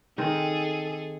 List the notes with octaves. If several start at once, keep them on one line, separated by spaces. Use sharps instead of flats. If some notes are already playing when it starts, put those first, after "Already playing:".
D#3 C4 G#4 A4